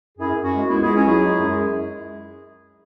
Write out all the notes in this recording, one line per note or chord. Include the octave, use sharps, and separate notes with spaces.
F#2 E4 G#4
F#2
C#4 F#4
G#3
C#2 B3 E4
E4 G#4
C#2
C#4 F#4
F#3 E4 G#4
G#3
F#2